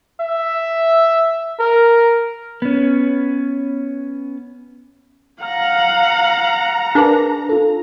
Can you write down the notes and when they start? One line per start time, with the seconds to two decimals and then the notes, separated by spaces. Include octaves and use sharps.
0.20 E5
1.59 A#4
2.62 B3 C#4
5.43 F5 F#5 A#5 F6
6.95 D4 G#4 A#4 B4
7.49 F4 A4